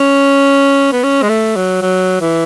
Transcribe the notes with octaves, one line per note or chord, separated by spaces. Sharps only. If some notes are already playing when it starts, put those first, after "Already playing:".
Already playing: C#4
B3
C#4
G#3
A3
F#3
F#3
E3